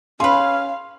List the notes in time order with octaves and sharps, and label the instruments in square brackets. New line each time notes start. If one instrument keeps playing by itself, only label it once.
[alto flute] C#4 [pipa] G#4 B4 [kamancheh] F5 [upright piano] C6